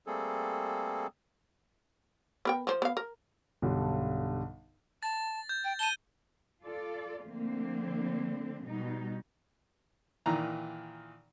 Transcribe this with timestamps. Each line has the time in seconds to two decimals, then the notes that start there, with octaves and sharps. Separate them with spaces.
0.07 G3 A3 A#3 C4 G#4 A4
2.45 B3 A#4 G5
2.67 F3 C5
2.82 B3 F5
2.97 A#4
3.62 B1 G2 D3 G3
5.03 A5 A6
5.49 G6
5.64 G5
5.79 A5 D#7 G7
6.63 F4 A4 D5
7.24 D3 F3 A3 A#3 C4
8.67 B2 G3 D#4
10.26 A#2 D#3 E3 A#5